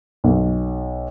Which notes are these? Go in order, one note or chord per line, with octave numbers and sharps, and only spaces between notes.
B1